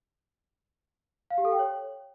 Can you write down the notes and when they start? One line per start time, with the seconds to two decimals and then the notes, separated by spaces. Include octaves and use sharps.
1.30 F5
1.38 G4
1.45 A4
1.52 G5
1.59 C#5